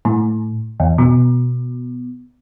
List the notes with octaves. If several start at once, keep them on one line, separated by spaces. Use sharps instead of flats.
A2
E2
B2